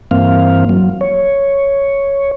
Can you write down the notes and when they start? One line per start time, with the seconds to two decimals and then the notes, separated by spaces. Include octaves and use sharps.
0.11 G2 E3 A#3 C4 F5
0.69 F#3
1.01 C#5